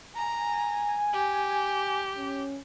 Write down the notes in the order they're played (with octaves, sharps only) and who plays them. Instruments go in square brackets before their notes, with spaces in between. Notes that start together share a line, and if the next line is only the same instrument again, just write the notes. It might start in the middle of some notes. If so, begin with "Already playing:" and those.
[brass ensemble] G#5 [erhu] A#5
[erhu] G4
[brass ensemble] C#4